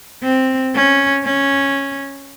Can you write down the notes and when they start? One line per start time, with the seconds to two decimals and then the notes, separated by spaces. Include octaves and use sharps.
0.23 C4
0.74 C#4
1.24 C#4